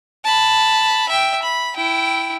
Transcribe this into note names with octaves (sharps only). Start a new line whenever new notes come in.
A5 B5
E5 G5
B5
E4 G5